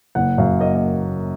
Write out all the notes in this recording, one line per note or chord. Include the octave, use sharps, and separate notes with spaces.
F#1 F#5
F#2 F5
A#3 D#5
D#5